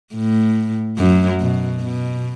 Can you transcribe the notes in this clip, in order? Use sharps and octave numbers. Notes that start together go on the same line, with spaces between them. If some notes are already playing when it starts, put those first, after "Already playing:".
A2
F#2
B2
B2